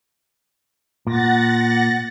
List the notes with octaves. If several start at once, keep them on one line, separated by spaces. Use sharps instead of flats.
A#2 F#5 A6 A#6